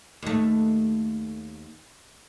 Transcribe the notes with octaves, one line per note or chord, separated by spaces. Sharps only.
D#2 A3